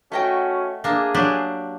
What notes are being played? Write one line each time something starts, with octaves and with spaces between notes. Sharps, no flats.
A3 C#4 F#4 D#5 G5
A#3 D4 G#4
F#3 D4 G4